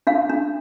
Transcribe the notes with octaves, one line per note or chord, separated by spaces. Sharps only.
D4 F5
D4